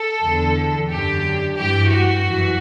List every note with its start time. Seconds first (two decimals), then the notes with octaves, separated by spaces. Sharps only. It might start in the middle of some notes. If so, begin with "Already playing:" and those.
Already playing: A4
0.23 E2 D3
0.90 F#2 D3 G4
1.56 G2 E3 G4
1.90 F#4
2.23 F#2 E3